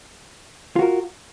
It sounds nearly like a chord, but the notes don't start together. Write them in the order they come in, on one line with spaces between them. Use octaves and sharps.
F4 F#4 A#4